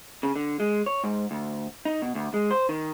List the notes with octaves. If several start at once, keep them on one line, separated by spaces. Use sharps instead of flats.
C#3
D3
G#3
C#5
G#2
D2
D#4
B2
D2
G#3
C5
D#3